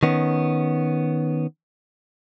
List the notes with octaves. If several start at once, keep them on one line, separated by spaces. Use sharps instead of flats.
D#3 B3 C#4